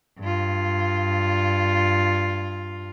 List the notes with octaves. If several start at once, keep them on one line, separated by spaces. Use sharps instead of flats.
G2 F4